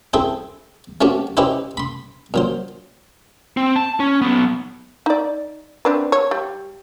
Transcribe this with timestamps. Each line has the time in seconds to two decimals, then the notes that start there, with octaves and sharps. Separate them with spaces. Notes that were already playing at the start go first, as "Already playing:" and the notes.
0.14 C4 E4 G#4 A4 C5
1.01 A3 C4 C#4 F#4 G4
1.37 C#4 D#4 E4 G4 B4 C5
1.77 B5 C6
2.34 A#2 F#3 C5
3.57 C4
3.76 A5
4.00 C#4
4.22 F#3 B3
5.06 D#4 D5
5.85 C4 D4 B4
6.12 C#5
6.31 G3